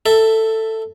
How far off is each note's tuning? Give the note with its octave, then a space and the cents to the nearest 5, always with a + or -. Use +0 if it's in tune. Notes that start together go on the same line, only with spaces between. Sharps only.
A4 +10 E5 +0